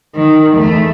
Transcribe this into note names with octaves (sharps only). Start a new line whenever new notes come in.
D#3
E2 A3